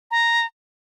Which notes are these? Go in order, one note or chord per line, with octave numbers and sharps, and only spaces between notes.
A#5